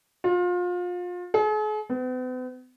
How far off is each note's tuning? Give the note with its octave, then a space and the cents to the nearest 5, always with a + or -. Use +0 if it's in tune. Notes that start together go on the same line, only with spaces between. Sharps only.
F4 +30
G#4 +45
B3 +45